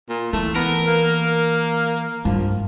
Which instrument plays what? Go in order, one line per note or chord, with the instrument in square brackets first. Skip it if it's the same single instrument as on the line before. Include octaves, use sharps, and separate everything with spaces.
[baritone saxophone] A#2
[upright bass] E3 [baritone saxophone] A3
[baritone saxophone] B3 [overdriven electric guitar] A#4
[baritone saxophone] A#3
[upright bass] G2 [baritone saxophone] F3